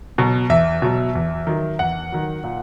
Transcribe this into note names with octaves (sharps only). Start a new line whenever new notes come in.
B2 F#3
E2 E5
B2 F#3
E2
D#3 F#3
E2 F#5
D#3 F#3
A#2